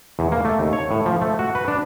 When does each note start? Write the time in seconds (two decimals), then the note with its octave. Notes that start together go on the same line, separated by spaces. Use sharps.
0.19 E2
0.32 A#3
0.45 A3
0.60 D#2
0.73 C#5
0.91 A2
1.06 F3
1.22 A3
1.39 F#4
1.55 B4
1.68 D4